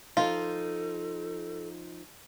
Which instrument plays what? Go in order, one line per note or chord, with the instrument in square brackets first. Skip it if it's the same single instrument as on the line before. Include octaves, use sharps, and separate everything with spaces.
[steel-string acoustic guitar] F3 D#4 [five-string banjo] F4 [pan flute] A4